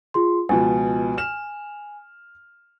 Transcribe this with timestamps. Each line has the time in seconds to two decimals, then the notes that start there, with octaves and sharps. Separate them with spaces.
0.14 F4 G#4 C6
0.49 C#2 B2 F3 G#5
1.18 F6 E7